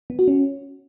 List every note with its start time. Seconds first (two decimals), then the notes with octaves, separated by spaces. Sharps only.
0.10 B3
0.19 F#4
0.28 C#4